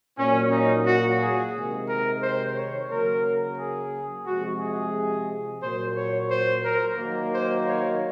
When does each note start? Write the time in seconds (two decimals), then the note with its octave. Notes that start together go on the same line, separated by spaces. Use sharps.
0.18 A#2 F#3 A#3 C#4
0.52 D#4
0.86 F#4
1.20 G#4
1.54 C3 D#3 G#3
1.88 A#4
2.22 C5
2.57 C#5
2.90 C#3 F#3 A#3 A#4
3.58 G#4
4.26 C3 F3 G#3 F#4
4.60 G#4
5.62 A#2 F#3 A#3 C5
5.97 C#5
6.31 C5
6.64 A#4
6.99 D#3 F#3 A#3
7.33 C5
7.67 C#5